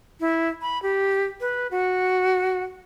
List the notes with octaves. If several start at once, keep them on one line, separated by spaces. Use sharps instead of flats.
E4
B5
G4
B4
F#4